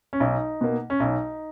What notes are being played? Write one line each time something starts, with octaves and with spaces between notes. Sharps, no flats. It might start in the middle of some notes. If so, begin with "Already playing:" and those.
C#4
B1 D#4
B2 A#3
C#4
B1 D#4